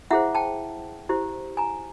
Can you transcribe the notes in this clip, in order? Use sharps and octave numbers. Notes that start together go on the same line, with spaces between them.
E4 G#4 C5 E5 F#5
G5 A5
E4 G4 C5
G#5 A#5